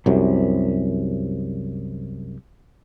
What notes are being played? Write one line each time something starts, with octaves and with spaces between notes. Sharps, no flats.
C2 F#2 C3